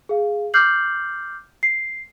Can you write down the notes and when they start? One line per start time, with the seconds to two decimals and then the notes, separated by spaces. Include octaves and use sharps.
0.09 G#4 F5
0.54 D6 F6 G6 C7 F#7
1.63 C7